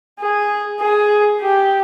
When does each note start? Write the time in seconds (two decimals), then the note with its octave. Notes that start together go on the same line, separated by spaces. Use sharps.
0.20 G#4
0.80 G#4
1.41 G4